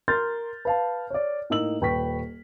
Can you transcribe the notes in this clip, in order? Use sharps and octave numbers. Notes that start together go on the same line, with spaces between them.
A#4 C6 F6 G6 A6
B4 F5 A5
C#5 D5
A2 A#3 D#4 E6 F#7
D#1 B4 G5 C#6 B6